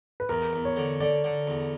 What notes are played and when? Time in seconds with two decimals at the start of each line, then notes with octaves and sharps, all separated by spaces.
0.20 B4
0.29 E2 A#4
0.53 E2
0.65 C#5
0.76 D3
1.00 D3 D5
1.24 D3
1.47 E2